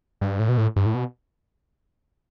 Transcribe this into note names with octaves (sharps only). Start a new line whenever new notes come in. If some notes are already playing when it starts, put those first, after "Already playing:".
G2
A2
B2
A2
G2
A2
B2